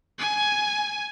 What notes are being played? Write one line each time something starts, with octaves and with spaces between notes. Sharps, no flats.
G#5